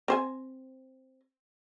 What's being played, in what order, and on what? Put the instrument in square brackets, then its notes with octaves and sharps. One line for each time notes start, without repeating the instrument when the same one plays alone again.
[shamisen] C4 C5 G#5